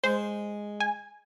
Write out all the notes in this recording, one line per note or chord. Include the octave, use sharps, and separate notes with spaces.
G#3 C5
G#5